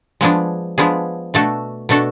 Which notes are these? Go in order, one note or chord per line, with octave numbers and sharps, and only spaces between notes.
F3 G#3 B3 D4 G#4
F3 G#3 B3 D4 G#4
B2 A3 D4 F#4 A4
B2 A3 D4 F#4 A4